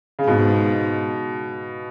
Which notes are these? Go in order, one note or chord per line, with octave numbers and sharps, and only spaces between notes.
C#3
G#2 B2